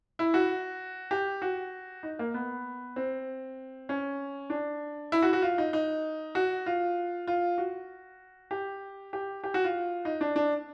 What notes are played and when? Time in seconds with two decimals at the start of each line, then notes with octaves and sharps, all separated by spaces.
0.19 E4
0.34 F#4
1.11 G4
1.42 F#4
2.03 D#4
2.19 A#3
2.34 B3
2.96 C4
3.89 C#4
4.50 D4
5.12 E4
5.22 F#4
5.33 F#4
5.42 F4
5.58 D#4
5.73 D#4
6.35 F#4
6.66 F4
7.27 F4
7.58 F#4
8.51 G4
9.13 G4
9.44 G4
9.54 F#4
9.64 F4
10.05 D#4
10.21 D4
10.36 D4